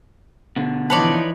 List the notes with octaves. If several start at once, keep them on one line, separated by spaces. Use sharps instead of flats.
B2 D3
E3 F3 D#4 B4 C#5 D5 A5